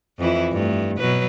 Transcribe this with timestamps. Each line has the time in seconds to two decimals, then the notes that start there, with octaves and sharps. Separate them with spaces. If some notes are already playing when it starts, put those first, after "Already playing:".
0.19 F2 E3 E4
0.52 G2 A3
0.98 B2 F#3 B4